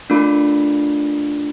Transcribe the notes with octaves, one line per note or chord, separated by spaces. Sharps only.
A3 D4 F4 A#4